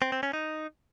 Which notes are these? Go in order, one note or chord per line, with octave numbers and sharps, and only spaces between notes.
C4
C4
C#4
D#4